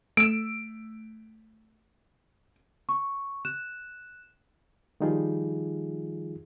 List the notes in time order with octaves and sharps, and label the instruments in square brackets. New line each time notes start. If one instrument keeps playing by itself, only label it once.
[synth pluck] A3 E6 [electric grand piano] D7
[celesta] C#6
F#6 E7
[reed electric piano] D#3 F3 G3 D#4 F4 G#4